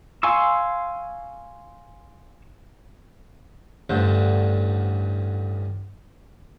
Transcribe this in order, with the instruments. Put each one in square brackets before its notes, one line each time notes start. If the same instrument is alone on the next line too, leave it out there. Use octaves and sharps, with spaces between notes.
[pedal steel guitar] F5 G#5 C6 C#6 E6
[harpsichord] A1 D2 G2 D3 C5